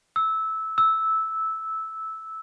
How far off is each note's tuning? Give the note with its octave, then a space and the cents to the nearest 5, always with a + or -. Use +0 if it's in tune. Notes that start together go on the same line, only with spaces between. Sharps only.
E6 -15
E6 -10